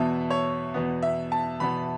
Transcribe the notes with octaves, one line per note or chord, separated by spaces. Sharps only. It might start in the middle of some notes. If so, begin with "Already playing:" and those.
Already playing: E2 B2 B3 E5 A5
C#5
E2 B2 B3
E5
A5
E2 B2 B3 B5